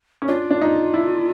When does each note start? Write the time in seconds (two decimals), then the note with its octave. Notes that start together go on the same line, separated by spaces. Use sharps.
0.22 C#4
0.28 D4 F4
0.50 D4
0.61 D#4
0.94 E4